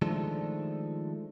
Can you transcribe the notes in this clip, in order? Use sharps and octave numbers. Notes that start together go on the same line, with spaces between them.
D#3 F3 G#3 A3 D4 A4